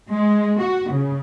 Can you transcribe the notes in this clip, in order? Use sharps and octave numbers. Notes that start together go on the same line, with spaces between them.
G#3
F#4
C#3